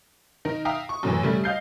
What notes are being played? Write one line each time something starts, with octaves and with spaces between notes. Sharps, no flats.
D#3 D#4 A#4
E5 F5 G5 A#5 D#6
C#6
F#2 A2 E3
C#3 G3 A3
D#5 F5 G6 C7